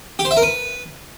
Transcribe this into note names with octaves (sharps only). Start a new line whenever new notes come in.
G4
C5
E5
A#4
B4